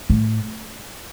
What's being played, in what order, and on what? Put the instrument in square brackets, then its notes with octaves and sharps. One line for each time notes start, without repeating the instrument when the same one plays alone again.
[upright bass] A2